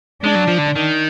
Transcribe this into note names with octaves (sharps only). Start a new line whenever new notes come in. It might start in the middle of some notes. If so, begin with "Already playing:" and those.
G#3 D4
F#3
F3
D3
D#3